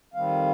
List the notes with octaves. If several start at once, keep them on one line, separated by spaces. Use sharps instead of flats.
F2 D#3 G3 C4 F5